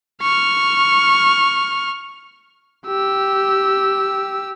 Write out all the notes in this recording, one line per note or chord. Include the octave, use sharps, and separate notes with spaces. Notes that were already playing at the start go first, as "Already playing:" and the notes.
C#6 F6
G4 E6